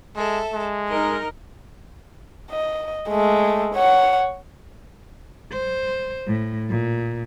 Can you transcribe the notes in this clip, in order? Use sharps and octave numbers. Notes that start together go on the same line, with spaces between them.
G#3 A4 E5
G#3
D#4 A#4 D#5
D#5
G#3 A3
C#5 F#5
C5
A2
A#2